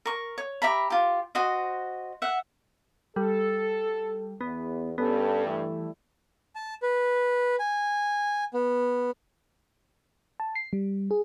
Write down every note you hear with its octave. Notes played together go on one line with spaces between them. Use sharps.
A#4 C#6
C#5
G4 E5 A#5 B5
F4 G4
F#4 C5 D#5
E5 F#5
G3 A4
E2 B3
G2 B3 C#4 A4
E3 G3 A3 E4
A5
B4
G#5
B3
A5
C7
G3
G#4